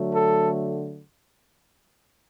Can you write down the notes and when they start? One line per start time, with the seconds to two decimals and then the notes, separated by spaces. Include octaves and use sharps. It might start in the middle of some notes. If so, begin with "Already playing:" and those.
Already playing: D3 F#3 A3
0.15 A4